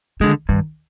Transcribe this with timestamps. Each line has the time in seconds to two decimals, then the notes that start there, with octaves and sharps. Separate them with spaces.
0.20 D3 D#3 G#3
0.49 G2 D#3